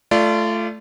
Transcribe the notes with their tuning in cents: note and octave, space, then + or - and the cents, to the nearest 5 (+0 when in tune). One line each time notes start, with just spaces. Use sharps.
A3 +0 F4 -25 D5 -5